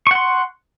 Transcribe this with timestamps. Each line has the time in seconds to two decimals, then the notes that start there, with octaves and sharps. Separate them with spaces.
0.07 C#6
0.11 F#5
0.15 C6